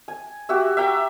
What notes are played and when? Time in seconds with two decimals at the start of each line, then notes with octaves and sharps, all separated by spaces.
0.08 G#5
0.49 F#4 G4 E5
0.77 E5 G5 A#5